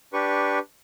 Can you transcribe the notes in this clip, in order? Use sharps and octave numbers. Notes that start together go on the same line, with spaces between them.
D4 G4 B4 C#6